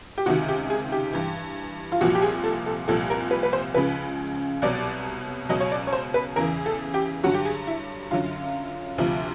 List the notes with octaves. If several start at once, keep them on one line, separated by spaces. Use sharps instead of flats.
G4
C#2 C3 D#3 F#4
G4
G#4
G4
G2 E3
F4
C2 A#2 F3 F#4
G4
G#4
A4
A4
C2 A#2 F3 A4
A#4
B4
B4
C5
C#2 C#3 F3 B4
C2 B2 F#3 D5
C#2 B2 F#3 D#5
C#5
D5
C#5
C5
B4
E2 C#3 E3 A#4
A4
G4
G2 D3 F#3 F#4
G4
G#4
E4
F#2 D3 F#3 F4
D2 C3 F3